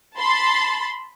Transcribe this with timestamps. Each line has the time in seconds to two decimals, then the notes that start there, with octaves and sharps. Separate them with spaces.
0.17 A5 B5 C6 A6